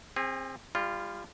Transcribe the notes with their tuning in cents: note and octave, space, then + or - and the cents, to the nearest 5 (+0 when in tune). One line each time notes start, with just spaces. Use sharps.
C4 +20 G#4 -25
G3 +30 F4 -10